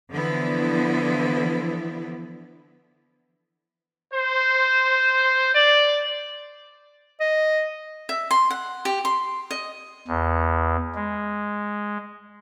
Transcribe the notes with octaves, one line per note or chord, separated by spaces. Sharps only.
D3 E3 F3 B3 E4
C5
D5
D#5
E5
C6
F#5
G4
C6
D#5
E2
G#3